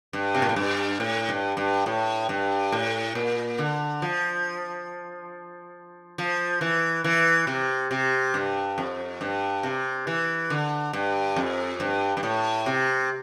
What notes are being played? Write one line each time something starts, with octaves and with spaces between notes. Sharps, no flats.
G2
C3
A#2
A2
G2
A2
G2
G2
A2
G2
A2
A#2
D3
F3
F3
E3
E3
C3
C3
G2
F2
G2
C3
E3
D3
G2
F2
G2
G2
A2
C3